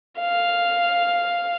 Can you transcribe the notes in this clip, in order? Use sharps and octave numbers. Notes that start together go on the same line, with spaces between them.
F5